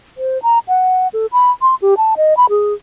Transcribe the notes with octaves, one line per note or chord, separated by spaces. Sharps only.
C5
A#5
F#5
A4
B5
C6
G4
A5
D#5
B5
G#4